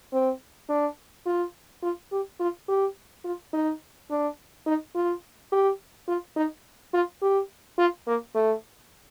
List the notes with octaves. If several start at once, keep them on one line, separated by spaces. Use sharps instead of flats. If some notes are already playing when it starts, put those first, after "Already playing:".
C4
D4
F4
F4
G4
F4
G4
F4
D#4
D4
D#4
F4
G4
F4
D#4
F4
G4
F4
A#3
A3